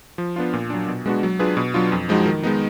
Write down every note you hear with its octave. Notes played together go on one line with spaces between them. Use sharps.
F3
B3 D4 F4
A#2
F#3 D4
B2
G#3 B3 D4 F#4
F#3
D4 F4 G#4 B4
B2
F#3 D4 F4
F2
F3 G#3 D#4 F#4
D#3
G#3 B3 D#4